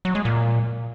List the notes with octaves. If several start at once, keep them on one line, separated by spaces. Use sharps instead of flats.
F#3
G#3
A#2